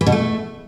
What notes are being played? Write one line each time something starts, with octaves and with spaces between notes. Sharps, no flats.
E3
B2
A3